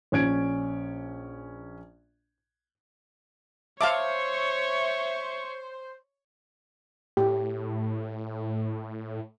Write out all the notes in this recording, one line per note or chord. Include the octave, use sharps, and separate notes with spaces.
A#1 C#4 G#6 D7
C5 C#5 E5 F5 A5 C#6 D6
A2 G4